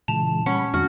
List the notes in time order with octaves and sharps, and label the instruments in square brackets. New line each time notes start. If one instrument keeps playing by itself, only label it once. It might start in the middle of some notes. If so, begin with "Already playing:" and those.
[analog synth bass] A#2 [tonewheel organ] C#3 E3 G#3 [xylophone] A5 F7
[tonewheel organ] G3 B5 [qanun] C#4 [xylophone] F#5
[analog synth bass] F2 [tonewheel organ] D#3 G#3 D4 [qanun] F#4 [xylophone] F6